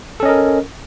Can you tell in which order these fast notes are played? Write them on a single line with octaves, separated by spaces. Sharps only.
A4 C#4 D#5 A#4